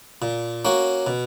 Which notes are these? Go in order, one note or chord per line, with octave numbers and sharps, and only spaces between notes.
A#2
A#3 C#4 F#4
B2